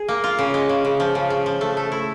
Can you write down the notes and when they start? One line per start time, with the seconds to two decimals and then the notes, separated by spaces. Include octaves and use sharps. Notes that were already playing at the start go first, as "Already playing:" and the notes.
Already playing: G#4
0.08 A#3
0.24 F4
0.39 C#3
0.54 G#3
0.69 C#3
0.85 C#3
1.00 F3
1.15 C#3
1.30 C#3
1.46 F3
1.61 A3
1.77 A3
1.92 E4